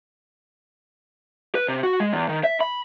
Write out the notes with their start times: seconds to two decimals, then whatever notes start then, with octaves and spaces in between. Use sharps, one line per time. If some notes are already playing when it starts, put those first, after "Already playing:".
1.55 B4
1.69 C3
1.83 F#4
2.00 G#3
2.13 E2
2.29 D#3
2.44 E5
2.61 B5